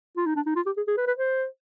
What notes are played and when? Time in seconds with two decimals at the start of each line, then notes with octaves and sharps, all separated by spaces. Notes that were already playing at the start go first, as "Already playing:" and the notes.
0.17 F4
0.26 D#4
0.36 D4
0.46 D#4
0.56 F4
0.66 G4
0.77 G#4
0.87 G#4
0.97 B4
1.07 B4
1.18 C5